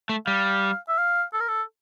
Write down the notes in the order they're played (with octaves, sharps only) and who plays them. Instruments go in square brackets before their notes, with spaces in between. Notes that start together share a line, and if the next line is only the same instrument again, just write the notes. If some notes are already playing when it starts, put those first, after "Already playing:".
[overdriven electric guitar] A3
[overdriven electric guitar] G3 [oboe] F5
[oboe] E5
F5
A4
A#4
A4